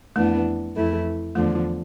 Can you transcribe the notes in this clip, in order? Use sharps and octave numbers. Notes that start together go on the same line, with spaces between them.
F2 E3 A3 B3 D4
F2 E3 A3 E4
E2 D3 F3 A3